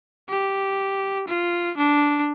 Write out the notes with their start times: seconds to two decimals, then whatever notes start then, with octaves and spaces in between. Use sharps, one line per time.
0.29 G4
1.27 F4
1.77 D4